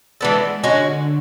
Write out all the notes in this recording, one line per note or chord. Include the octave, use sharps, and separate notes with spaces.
E3 G#3 B3 D4 A4
D3 G#3 C#4 F#4